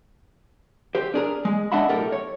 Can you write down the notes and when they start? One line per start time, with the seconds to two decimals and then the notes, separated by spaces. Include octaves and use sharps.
0.95 G4 C5
1.14 D4 G#4 A#4
1.45 G#3
1.72 D4 D#5 E5 F#5 B5
1.89 B1 A2 G4 A4 A#4 G5
2.12 C#5